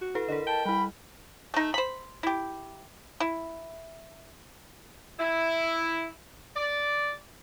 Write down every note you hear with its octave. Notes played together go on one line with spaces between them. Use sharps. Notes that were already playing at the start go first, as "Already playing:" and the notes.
F#4
E4 A4 B4
D3 A#4 D#5
G5 A5
G3 E4 B5
A3 D#4
C5 B5
E4 G4
E4
E4
D5